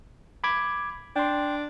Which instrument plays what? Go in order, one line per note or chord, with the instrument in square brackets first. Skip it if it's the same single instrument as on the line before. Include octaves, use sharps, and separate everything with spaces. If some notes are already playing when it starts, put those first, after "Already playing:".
[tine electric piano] B5 D6 G#6
[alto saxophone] D4 [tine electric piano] G5 C6